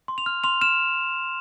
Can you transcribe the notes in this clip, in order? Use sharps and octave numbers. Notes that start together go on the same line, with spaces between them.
C6
F7
F6
C6 F7
F6 E7